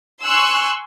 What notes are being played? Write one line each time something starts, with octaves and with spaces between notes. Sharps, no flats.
G#5 C6 C#6 E6 F#6